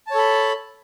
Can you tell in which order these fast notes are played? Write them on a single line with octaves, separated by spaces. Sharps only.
A5 C#5 A4 B5